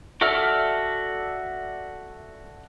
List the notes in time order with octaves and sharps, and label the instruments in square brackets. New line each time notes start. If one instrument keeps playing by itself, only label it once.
[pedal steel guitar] F#4 A4 D5 E5 F6